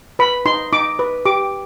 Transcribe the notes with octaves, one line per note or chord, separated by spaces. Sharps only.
B4 B5
D#4 C6
D#4 D6
B4
G4 D6